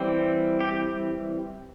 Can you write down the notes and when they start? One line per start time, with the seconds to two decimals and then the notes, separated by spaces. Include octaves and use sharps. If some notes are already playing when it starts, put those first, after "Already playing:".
Already playing: E3 G3 C4
0.61 G4